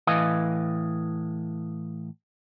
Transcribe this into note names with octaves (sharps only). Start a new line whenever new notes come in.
A2 E3 B4 D#5 F5 G#5